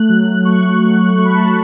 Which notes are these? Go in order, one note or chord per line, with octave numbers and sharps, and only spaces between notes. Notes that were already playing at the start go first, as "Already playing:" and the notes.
Already playing: A3 F#6
F#3
A3 C#6
F#3
A3 C#6
B5
A5
B5